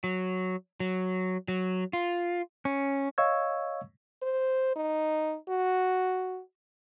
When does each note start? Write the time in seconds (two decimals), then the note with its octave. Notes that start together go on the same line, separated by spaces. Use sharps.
0.04 F#3
0.80 F#3
1.48 F#3
1.93 F4
2.65 C#4
3.18 C#5 D#5 F5 C#6 E6 G#6
4.22 C5
4.76 D#4
5.49 F#4